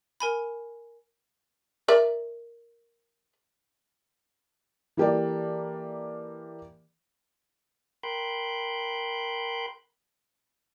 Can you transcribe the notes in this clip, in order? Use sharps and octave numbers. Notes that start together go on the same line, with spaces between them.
A#4 G#5 B5
A#4 D5 E5
E3 A#3 G4 A4 D5
A#4 G5 B5 C6 F#6 G6